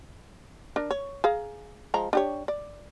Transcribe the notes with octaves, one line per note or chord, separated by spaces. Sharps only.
D4 A#4
C#5
G#4 F5 A#5
F3 G#3 A#5
D4 G4 C#5
D5